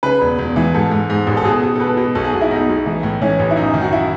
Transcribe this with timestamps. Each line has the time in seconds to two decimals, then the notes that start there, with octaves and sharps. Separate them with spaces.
0.03 C#3 B4
0.21 E1
0.38 E1
0.56 E3
0.74 G#2 A4
0.91 G#2
1.10 G#2
1.27 A1
1.37 A4
1.45 B2 G#4
1.63 B2
1.75 A4
1.80 B2 B4
1.97 B2
2.15 B1 A4
2.24 G#4
2.33 B1 F#4
2.41 E4
2.51 B1 D#4
2.69 B1
2.86 E3
3.03 A2
3.22 E3 C#4
3.39 A1
3.51 E4
3.56 F#2 D#4
3.74 D#3
3.81 F#4
3.93 E4